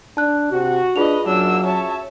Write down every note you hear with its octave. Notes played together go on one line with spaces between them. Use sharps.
D4 A5 F#6
C3 F#4
D4 F4 G#4 B4 D#5 F7
F#2 F#3 A#3 D4 E6
C#4 F#4 C#5 E5 A5